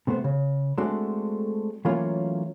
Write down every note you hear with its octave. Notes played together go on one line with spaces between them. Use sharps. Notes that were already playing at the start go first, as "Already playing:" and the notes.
C3 A3 B3 C5
C#3
G#3 A3 C4 D4 F#4 A4
E3 F#3 A3 A#3 C#4 F4